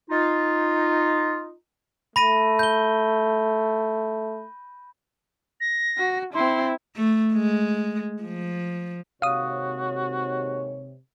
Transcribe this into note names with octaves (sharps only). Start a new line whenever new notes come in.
D#4 F4
A3 B5 A#6 D#7
G6 G7
A#6
F#4
C4 E4 C6
A3
G#3
F3
D#2 G#2 C3 F#4 C#5 F5 D#6